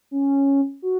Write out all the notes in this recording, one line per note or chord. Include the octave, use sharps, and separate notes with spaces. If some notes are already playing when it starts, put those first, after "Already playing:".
C#4
F#4